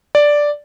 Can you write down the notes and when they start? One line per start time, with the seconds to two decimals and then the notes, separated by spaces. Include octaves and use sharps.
0.15 D5